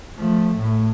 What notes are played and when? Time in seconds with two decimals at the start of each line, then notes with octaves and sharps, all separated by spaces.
0.18 F3 A3
0.57 A2